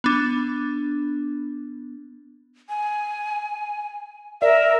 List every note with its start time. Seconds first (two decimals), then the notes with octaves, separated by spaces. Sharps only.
0.04 B3 D4
2.69 G#5
4.42 A#4 D5 E5